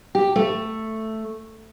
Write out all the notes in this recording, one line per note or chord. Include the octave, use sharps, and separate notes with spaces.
G4
A3